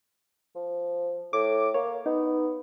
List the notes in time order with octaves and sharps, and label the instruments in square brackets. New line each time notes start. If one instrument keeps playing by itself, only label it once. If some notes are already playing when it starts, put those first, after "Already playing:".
[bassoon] F3
[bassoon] A2 [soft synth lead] D6
[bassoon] A#3 [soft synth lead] C#5
[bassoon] B3 [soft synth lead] D#4